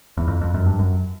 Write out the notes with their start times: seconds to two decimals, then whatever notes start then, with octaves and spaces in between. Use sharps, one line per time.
0.17 E2
0.28 F2
0.41 F2
0.54 F#2
0.66 G2
0.79 F#2